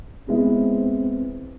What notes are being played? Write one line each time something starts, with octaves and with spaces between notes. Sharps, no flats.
G#3 B3 C4 E4